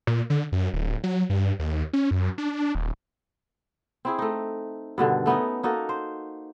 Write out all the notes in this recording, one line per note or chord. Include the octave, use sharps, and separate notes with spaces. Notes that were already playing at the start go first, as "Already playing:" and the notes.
A#2
D3
F#2
D1
F#3
G2
D#2
C#4
F#2
D4
D#1
C4 E4 G#4
A3 D#4
G2 B2 D3 D#3
A3 B3 C#4 D#4
A#3 D#4 F#4 A4
C5